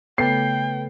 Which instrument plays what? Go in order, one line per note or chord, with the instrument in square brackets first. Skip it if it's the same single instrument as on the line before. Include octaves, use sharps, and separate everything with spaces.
[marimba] C#3 A3 [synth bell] B3 A4 B4 [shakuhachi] G5 [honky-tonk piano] C7